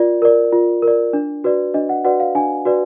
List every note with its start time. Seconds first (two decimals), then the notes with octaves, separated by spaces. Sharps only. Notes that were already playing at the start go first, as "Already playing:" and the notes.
Already playing: F4 A#4 D5
0.22 A#4 D5
0.52 F4
0.83 A#4 D5
1.13 D4
1.44 F#4 B4 D5
1.74 D4 D#5
1.89 F#5
2.05 F#4 B4 D5 F#5
2.20 F5
2.35 D4 G#5
2.65 F#4 B4 D5